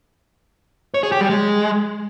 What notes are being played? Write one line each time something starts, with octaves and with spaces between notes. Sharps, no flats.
C#5
G#4
G4
G3
G#3